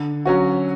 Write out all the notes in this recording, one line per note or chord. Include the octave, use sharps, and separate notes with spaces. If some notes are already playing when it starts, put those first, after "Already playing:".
Already playing: D3
F#3 C#4 F#4